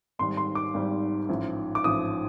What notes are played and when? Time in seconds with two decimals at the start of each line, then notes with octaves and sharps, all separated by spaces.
0.19 G#1 G#2 D#3 G3 C6
0.37 C6
0.55 D6
0.74 G#1 G#2 D#3 G3
1.29 A1 G#2 F3
1.75 D6
1.84 A1 G#2 F3 D#6